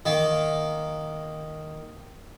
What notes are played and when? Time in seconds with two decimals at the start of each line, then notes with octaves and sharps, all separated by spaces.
0.06 D#3 A#3